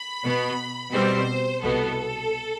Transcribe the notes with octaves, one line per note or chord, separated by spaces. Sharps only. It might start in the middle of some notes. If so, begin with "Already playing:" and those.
Already playing: B5
B2 B3
B2 G3 C4 C5
C2 B2 B3 A4